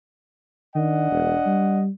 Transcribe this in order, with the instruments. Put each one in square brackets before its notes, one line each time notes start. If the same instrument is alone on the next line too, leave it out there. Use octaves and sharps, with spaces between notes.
[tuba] D#3 [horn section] D4 D#5 F#5
[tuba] E1
G3